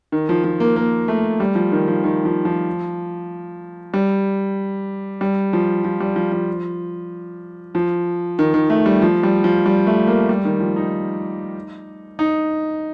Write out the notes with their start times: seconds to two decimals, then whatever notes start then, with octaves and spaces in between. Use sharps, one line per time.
0.12 D#3
0.29 F3
0.44 F3
0.60 A#3
0.76 A#3
1.08 A3
1.40 G3
1.55 F3
1.72 D#3
1.88 F3
2.04 D#3
2.25 F3
2.45 F3
3.94 G3
5.21 G3
5.53 F3
5.84 F3
6.00 G3
6.16 F3
6.32 F3
7.75 F3
8.39 D#3
8.54 D#3
8.70 A3
8.86 G3
9.02 F3
9.23 G3
9.44 F3
9.66 G3
9.87 A3
10.07 A#3
10.29 G3
10.45 D#3
10.60 F3
10.76 D#4
12.19 D#4